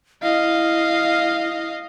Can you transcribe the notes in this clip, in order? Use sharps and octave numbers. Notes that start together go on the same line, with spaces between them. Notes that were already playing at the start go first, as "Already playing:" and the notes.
E4 D#5 F5